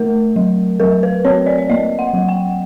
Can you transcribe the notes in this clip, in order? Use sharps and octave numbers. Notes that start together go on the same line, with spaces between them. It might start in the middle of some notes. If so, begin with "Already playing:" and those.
Already playing: A3 A#4
F#3
F#3 A#4
B4
C4 C#5
D5
D5
A#3 D#5
F#5
F#3
G5